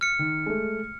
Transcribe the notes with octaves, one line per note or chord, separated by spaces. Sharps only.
F6 C#7
D#3
G#3 A3